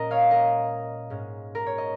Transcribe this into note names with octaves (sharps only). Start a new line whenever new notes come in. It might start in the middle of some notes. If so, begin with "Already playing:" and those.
Already playing: A#2 G#3 C#4 A#4 D#5
C#5 F5
A#4 D#5
G#2 G#3 C#4
A#4
C#5
D#5